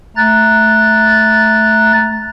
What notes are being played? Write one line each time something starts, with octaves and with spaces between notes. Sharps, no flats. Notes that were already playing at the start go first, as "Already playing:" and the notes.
A3 A#5 F#6 A6